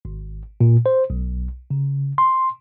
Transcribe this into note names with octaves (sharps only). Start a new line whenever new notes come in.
G#1
A#2
C5
B1
C#3
C6